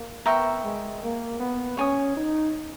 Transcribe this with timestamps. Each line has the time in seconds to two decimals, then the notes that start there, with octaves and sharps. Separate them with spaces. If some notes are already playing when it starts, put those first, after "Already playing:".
Already playing: A#3
0.26 B3 A#4 E5 G5 C#6
0.63 G#3
1.02 A#3
1.39 B3
1.77 C#4 C#5 G#5 D#6
2.15 D#4